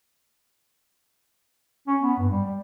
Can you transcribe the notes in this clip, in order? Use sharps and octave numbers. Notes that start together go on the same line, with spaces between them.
C#4
B3
G2
G3
G3